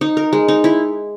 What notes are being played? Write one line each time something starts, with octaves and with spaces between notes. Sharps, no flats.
D#4
A#4
G#3
D#4
E4